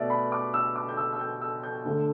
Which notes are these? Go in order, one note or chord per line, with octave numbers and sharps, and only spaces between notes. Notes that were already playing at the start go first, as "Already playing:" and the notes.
Already playing: B2 A3 D5 E5
B5
D6
E6
D6
G6
E6
E6
G6
E6
G6
D2 D3 A3